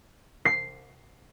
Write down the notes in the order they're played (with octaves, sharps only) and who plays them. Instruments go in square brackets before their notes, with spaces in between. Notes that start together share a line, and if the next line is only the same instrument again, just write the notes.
[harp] C7